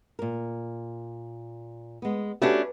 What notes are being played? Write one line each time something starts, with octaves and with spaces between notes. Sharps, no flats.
A#2 A#4
G#3 B3
A3 C#4 D4 F#4 G4 B4